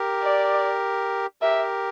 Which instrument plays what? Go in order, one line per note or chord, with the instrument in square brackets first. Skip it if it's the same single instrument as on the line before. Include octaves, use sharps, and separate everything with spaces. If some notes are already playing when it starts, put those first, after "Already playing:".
Already playing: [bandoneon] G4 A#4
[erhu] D5
[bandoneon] G4 A#4 [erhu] E5